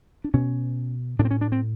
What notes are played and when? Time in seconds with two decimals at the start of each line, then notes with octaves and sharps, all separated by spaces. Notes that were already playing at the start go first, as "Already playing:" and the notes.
0.24 D4
0.34 B2 C#4
1.19 A2 D4
1.25 C4
1.31 C#4
1.41 D4
1.52 C4